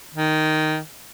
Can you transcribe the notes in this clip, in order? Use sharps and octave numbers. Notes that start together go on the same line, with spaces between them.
D#3